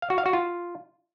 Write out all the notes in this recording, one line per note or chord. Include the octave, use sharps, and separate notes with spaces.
F5
F#4
F5
F#4
F4